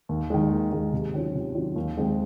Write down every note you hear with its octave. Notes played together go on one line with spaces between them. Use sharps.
D#2
D#3 G#3
D#2
D#3 G#3
C3
D#3 F#3 C#4 F4
C3
D#3 F#3 C#4 F4
D#2
D#3 G#3 C4